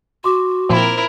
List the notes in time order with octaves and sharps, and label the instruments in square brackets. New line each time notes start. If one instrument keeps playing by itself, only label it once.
[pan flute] F#4 [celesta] C6 D6
[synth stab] A#2 F3 C4 [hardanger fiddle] E4 A#4